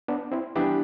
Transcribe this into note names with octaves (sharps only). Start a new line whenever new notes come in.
B3 D4
C4 E4
E3 G3 B3 D4 E4 G4